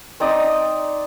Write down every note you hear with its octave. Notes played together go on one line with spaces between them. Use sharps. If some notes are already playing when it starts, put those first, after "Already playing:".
C4 D#4 D5 D#6